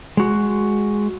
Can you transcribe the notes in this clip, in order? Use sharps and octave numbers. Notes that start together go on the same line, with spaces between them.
G#3 F#4